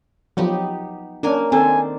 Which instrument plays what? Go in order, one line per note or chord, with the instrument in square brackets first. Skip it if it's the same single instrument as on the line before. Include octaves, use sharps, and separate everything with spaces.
[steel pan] F3 F#3 [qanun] B3 D#4 G4
[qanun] A#3 A#4 G#5 [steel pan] C#4 D4
[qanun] D#3 D4 C5 [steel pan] C4 A4 [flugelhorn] G#5